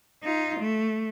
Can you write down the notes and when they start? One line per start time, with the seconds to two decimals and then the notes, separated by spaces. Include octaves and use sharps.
0.23 D#4 F4
0.59 A3